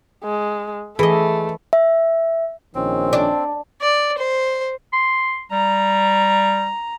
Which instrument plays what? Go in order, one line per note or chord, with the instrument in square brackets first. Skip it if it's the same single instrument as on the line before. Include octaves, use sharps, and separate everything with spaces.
[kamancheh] G#3
[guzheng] E3 D#5 [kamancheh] A3 [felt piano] G#4
[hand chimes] E5
[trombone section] A#1 D#3 C#4 [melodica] C4
[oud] D4
[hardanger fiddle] D5
C5
[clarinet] C6
[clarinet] G3 [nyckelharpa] A#5